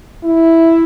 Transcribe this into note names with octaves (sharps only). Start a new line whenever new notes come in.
E4